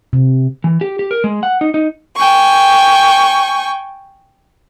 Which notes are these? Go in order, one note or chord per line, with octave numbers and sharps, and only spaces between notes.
C3
E3
G4
G4
A#4
G#3
F#5
D#4
D#4
G5 G#5 C#6